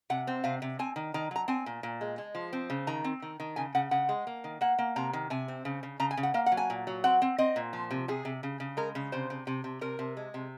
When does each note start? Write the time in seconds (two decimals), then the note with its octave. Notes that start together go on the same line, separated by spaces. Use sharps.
0.10 C3 F#5
0.27 C4
0.44 C3 F5
0.62 C3
0.79 C4 G#5
0.96 D#3
1.14 D#3 A#5
1.31 F#3 A#5
1.48 C4 G#5
1.66 A#2
1.83 A#2
2.01 G#3
2.18 G#3
2.35 F3
2.53 C4
2.70 C#3
2.87 D#3 A#5
3.04 C4
3.22 D#3
3.40 D#3
3.56 C#3 G#5
3.75 C#3 F#5
3.91 C#3 F#5
4.09 G#3
4.27 A#3
4.44 D#3
4.61 A#3 F#5
4.79 A#3
4.96 C3 A#5
5.13 D#3
5.30 C3 G#5
5.48 C4
5.65 C#3
5.83 C#3
6.00 C#3 A#5
6.11 G#5
6.17 C#3
6.23 F#5
6.34 A#3 F5
6.46 F#5
6.52 F#3
6.57 G#5
6.70 A#2
6.87 F#3
7.04 C4 F#5
7.22 C4
7.38 C4 D#5
7.56 A#2
7.73 F3
7.91 C3
8.08 C3 G#4
8.25 C3
8.43 C#3
8.60 C#3
8.77 G#3 A#4
8.95 C#3
9.12 C3 C5
9.30 C3
9.47 C3
9.64 C3
9.81 C3 A#4
9.99 C3
10.17 G#3
10.34 C3